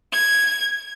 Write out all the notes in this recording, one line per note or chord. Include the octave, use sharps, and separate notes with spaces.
G#6